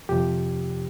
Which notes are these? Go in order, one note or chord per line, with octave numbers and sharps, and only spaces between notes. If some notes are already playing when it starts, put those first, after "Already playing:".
F2 C3 F3 G4